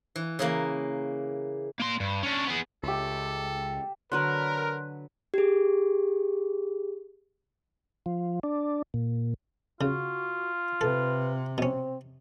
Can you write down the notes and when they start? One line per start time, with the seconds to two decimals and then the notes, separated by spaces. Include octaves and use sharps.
0.16 E3
0.39 C#3 E3 A#3
1.80 A#3 C6
2.00 G2
2.23 C#4 D4
2.47 B3 G#4
2.83 C#2 G4 A4 E5
4.12 D3 F#3 A#4 B4 C6 F#6
5.34 G4 G#4
8.06 F3
8.43 D4
8.94 A#2
9.81 C#3 F4 F#4
10.81 C3 A4 B4
11.58 B2 C4 C#4